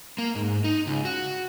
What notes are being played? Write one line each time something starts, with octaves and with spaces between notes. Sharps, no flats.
A#3
G#2
D#4
C#2
F#4